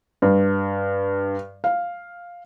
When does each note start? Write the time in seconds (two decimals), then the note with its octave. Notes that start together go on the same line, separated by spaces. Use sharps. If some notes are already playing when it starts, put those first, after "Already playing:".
0.22 G2
1.64 F5